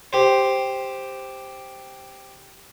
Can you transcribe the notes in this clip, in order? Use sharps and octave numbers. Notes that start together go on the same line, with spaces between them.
G4 C5